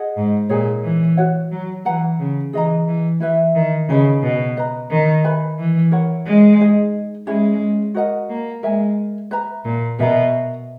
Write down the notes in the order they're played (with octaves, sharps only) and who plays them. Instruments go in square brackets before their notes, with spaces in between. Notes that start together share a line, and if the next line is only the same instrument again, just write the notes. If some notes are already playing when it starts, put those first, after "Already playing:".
Already playing: [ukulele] G#4 D#5 F#5
[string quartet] G#2
[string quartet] A#2 [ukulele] D#4 G#4 C#5 G#5
[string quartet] E3
[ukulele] F#4 C#5 F#5
[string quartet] F#3
[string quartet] E3 [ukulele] B4 F#5 A#5
[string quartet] C#3
[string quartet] E3 [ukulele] G#4 D#5 A#5
[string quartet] E3
[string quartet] E3 [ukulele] E4 B4 E5
[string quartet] D#3
[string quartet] C#3 [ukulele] D#4 G#4 B4 D#5
[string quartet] B2
[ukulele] B4 D#5 A#5
[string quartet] D#3
[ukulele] B4 E5 G#5 B5
[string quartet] E3
[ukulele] E4 A#4 C#5 F#5
[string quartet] G#3
[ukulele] D#4 G#4 D#5
[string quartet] G#3 [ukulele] C#4 E4 G#4
[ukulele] F#4 A#4 D#5 F#5
[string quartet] A#3
[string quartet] G#3 [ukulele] A#4 E5 G#5
[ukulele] B4 E5 A#5
[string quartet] A#2
[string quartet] B2 [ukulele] A#4 E5 A#5